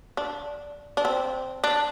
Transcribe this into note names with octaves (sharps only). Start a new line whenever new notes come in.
D4
D4
C4
D4